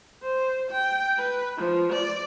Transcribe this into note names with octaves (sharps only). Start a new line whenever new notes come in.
C5
G5
B4
F3
D5